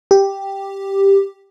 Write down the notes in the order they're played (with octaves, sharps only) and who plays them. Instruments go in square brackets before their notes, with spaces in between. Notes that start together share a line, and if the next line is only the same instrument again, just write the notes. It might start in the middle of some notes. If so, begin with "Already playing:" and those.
[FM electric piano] G4